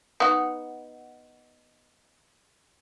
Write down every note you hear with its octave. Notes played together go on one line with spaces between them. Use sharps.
B3 D#4 F#4